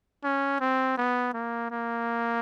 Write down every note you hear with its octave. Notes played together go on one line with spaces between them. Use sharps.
C#4
C4
B3
A#3
A#3